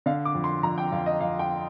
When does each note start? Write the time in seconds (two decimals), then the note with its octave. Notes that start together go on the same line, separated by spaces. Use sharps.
0.06 D3 F5
0.25 D6
0.35 F2
0.44 C6
0.63 F2 A#5
0.78 G5
0.92 F2 F5
1.06 D#5
1.21 F2 F5
1.39 G5